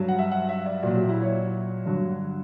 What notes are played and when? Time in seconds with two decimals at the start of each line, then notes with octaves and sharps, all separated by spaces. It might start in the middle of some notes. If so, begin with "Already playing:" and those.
Already playing: G2 F#3
0.08 F#5
0.19 E5
0.31 F#5
0.49 E5
0.66 D5
0.83 A#2 F#3 D5
0.97 G4
1.09 E4
1.22 C#5
1.85 G2 D3 F#3